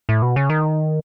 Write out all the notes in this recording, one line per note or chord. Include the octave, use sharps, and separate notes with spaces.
A2
B2
C#3
D#3